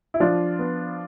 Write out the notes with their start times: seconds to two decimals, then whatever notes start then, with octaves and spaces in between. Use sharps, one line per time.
0.14 E4
0.20 F3 D4 F4
0.59 B3